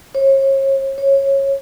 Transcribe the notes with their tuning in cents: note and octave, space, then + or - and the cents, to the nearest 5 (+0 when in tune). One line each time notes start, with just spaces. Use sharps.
C#5 -35
C#5 -15